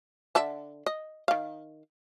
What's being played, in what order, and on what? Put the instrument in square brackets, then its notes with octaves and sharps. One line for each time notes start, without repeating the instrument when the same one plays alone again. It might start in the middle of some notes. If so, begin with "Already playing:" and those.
[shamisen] D3 E5 A5
D#5
D#3 F5